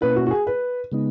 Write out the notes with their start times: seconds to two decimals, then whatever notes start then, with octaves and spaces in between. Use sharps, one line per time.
0.01 B2 A#3 C#4 E4 B4
0.16 F#4
0.26 F#4
0.31 G#4
0.47 B4
0.92 C#3 G#3 B3 D#4